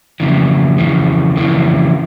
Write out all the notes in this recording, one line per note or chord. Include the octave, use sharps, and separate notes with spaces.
F2 C#3 E3
F2 C#3 E3
F2 C#3 E3